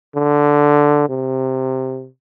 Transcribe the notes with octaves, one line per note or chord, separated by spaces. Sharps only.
D3
C3